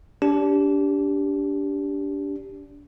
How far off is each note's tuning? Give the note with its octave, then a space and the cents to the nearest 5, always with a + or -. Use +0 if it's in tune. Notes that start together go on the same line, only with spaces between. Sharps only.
D4 -25 G4 +0